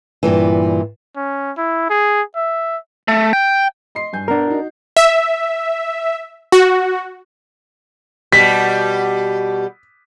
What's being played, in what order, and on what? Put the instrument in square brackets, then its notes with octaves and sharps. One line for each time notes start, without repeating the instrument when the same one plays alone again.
[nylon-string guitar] G2 A#2 E3
[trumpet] C#4
E4
G#4
E5
[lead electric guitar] A3
G5
[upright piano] D#5 C6 C7
G2 G#5 G6
[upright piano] B3 F#5 [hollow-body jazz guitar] D4 A#4
[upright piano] D#4 F#4
[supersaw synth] E5
F#4
[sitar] B2 G3 [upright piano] B6